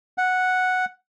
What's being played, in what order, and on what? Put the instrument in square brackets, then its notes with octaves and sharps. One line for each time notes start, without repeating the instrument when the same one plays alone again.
[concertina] F#5